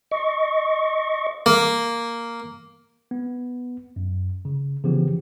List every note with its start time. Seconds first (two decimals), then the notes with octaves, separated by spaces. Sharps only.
0.11 D#5 C#6
1.46 A#3
3.11 B3
3.96 F#2
4.45 C#3
4.84 C#3 E3 F3 B3 G4